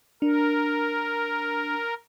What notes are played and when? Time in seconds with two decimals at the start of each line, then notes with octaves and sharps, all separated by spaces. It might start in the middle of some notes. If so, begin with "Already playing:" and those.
0.22 D4 A#4